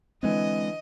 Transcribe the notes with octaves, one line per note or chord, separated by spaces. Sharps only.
D3 E3 G#3 C4 D#5